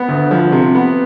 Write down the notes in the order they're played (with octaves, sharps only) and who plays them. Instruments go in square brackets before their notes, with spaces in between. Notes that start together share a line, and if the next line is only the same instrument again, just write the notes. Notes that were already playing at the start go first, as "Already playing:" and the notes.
Already playing: [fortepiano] B3
D2
F3
C3
B3